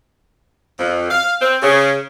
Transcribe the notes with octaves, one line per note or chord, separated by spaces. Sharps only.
F2
F5
C4
C#3